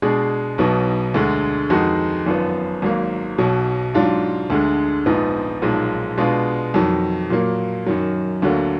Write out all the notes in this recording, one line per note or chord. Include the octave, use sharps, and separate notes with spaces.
B2 G#3 D4 G#4
B1 B2 F#3 B3 D#4
D2 D3 G#3
F2 D#3 G#3 D#4 F#4
G#1 F#2 F3 B3
G#1 G#2 F#3 A#3
B1 B2 F#3
G#2 F#3 D4 F4
D2 D3 G#3
A#1 G#2 F3 B3 D#4
B1 A#2 F3 G#3 D#4
B2 G#3 B3 D4 F4
F2 D#3 F#3
A#2 F#3 A#3
F#2 D#3 F#3
D2 D3 F#3 A#3